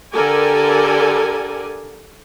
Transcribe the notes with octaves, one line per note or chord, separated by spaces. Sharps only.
D3 G4 A4 A#4 D5 G#5